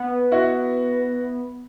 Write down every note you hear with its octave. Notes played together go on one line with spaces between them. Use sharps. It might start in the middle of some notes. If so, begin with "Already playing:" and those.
Already playing: B3
E4 F#4